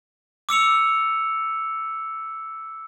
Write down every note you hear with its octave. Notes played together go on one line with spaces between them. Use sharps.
D6 E6 C#7 F7